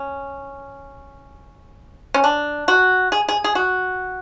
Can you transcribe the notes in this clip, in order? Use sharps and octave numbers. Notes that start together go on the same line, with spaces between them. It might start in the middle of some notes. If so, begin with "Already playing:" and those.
Already playing: C#4
C#4
D4
F#4
G#4
G#4
G#4
F#4